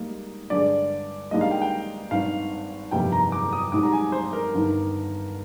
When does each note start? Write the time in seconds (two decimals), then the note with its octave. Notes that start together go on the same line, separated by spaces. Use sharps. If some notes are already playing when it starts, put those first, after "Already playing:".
Already playing: G#2 G3 A#3 D#4
0.50 G2 D3 G#3 D5
1.31 G#2 D#3 G3 A#3 D4 D#5
1.41 F5
1.51 G5
1.62 G5
2.11 G#1 G2 D#3 F5
2.91 G1 F2 C3 G3 A#3 G5
3.12 A#5
3.32 D6
3.52 D#6
3.72 G#1 G#2 G3 D6
3.83 A#5
3.93 G#5
4.12 C5
4.33 A#4
4.53 G1 G2 D#3